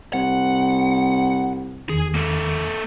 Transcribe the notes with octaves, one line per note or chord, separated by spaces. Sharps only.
C2 F#5
E2 D#3 G#4
A#3 A4